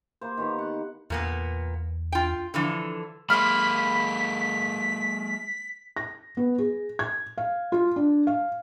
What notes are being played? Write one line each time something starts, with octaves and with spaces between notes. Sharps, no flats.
A#3 C5
D#3 B3 F4 G4
F#5
E2 A#2 A#3 B3
F4 G5
D3 E3 F3
G#3 A#3 B5 C6 D6 F6 B6
A#6
B3
G#4
G#6
F5
F4
D4
F5